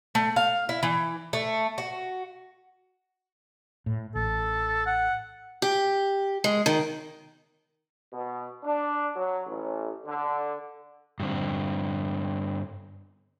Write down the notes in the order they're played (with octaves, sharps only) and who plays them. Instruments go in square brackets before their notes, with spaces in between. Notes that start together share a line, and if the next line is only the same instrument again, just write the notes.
[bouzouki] A3
F5
E4
E3
A3
F#4
[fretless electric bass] A2
[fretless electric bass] A1 [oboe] A4
[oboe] F#5
[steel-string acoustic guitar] G4
G#3
D#3
[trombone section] B2
D4
F#3
A1
D3
[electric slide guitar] G2 D3 C4